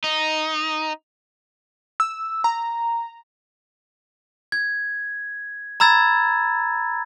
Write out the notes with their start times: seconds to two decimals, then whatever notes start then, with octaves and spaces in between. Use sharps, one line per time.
0.04 D#4
2.00 E6
2.44 A#5
4.52 G#6
5.80 A#5 B5 E6 G#6 A6